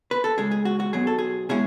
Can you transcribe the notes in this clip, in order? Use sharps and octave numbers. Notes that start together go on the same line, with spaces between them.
B4
A4
C#2 C#3 G#3 G#4
G#4
F#4
F#4
B1 B2 F#3 G#4
A4
G#4
B2 G#3 C#4 E4 G#4